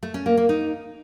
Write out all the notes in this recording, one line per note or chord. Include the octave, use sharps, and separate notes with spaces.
A3
C#4
A#3
A#3
D#4